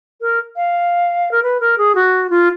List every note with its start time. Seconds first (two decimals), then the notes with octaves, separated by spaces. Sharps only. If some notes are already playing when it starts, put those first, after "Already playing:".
0.21 A#4
0.56 F5
1.31 A#4
1.43 B4
1.60 A#4
1.78 G#4
1.95 F#4
2.30 F4